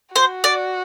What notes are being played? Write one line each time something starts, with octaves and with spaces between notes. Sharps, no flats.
F#4 C5
D5